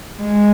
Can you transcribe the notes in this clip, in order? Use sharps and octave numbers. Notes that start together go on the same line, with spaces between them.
G#3